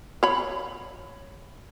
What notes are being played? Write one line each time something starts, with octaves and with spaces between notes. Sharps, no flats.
C#5 B5